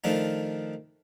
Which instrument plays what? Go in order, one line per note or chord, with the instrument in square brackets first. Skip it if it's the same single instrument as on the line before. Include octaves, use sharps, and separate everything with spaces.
[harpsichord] D#3 F3 A3 D4 D#4